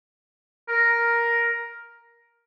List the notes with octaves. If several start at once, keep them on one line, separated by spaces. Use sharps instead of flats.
A#4